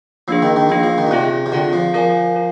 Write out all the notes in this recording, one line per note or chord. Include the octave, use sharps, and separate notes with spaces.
F3 A#3 D4 G#4
D#3
D#3
F3 A#3 D4 G#4
F3
D#3
A#2
C3 C4 F4 G#4 D5
C3
D3 C4 F4 G#4 D5
F3
F3 F4 A#4 D5 G#5
F4 A#4